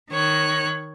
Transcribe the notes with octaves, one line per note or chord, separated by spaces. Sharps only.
D#3 C#5 F#6